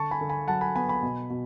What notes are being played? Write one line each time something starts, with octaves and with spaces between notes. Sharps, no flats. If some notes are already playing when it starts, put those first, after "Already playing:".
Already playing: D3 A5 C#6
G#5 B5
D3
G#5 B5
F#3 F#5 A5
G#5 B5
B3 G#5 B5
G#5 B5
B2
B2